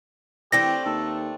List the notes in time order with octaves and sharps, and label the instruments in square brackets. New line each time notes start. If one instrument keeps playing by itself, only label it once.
[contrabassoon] E3 [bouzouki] A3 C4 D4 [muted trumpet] G4 [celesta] A#6
[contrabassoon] D#2 [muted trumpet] A4